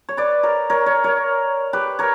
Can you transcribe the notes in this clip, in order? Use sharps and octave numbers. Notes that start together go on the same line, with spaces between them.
C#5
B4 D5
A#4 C#5
A#4 C#5
A#4 C#5
A#4 C#5
G4 B4
A#4 C#5